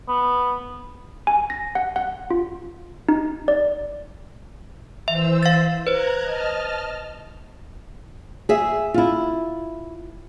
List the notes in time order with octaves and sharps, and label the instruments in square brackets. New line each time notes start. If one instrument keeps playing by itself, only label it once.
[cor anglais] B3
[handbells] G#5
A#6
F#5
F#5
F4
D#4
D5
[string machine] E3 C5 E6 [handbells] E5
[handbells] F5 A6
[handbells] B4 C5 [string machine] A#5 F#6 G#6
[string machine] D#5 A5 F6
[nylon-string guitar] G#4 E5
E4 F4